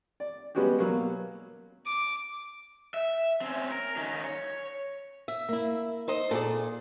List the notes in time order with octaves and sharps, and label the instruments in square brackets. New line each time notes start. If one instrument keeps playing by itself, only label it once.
[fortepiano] D5
G3 G#3 B3 C#4 F#4 G4
B2 F#3 A#3
[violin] D6
[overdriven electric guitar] E5
C4 C#4
A#4
D#3 C#4
C#5
[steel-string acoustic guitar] E5
[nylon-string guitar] A#3 E4
[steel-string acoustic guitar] D#4 C5 D#5
[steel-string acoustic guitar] A#2 D5 [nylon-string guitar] G#4 A4